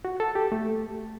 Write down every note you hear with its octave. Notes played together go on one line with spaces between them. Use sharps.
F#4
A4
G4
A3